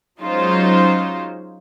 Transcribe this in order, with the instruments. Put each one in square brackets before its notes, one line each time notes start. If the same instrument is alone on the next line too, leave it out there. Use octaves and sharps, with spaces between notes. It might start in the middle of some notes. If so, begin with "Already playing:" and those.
[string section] F#3 G#3 C#4 D#4 F4 C5